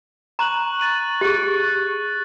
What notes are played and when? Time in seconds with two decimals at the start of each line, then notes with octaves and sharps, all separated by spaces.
0.39 A#5 C#6 F#6 F#7
0.80 A6 D#7 F#7
1.21 G4 G#4 F#6 A6